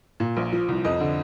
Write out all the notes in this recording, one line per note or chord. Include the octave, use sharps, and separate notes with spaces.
A#2
A#1
F3
C2
F2 D#5
D3